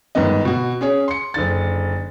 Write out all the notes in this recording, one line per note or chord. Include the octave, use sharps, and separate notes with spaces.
G1 G#2 D#3 B3 D#5
B2 F#4
C#4 G#4 C#5
C6 C#7
F#1 D3 A6